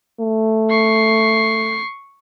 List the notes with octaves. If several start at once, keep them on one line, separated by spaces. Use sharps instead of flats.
A3
C#6 C7